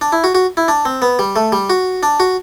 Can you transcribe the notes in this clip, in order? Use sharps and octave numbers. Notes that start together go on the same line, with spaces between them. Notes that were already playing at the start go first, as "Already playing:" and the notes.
D4
E4
F#4
F#4
E4
D4
C4
B3
G3
A3
G3
F#4
D4
F#4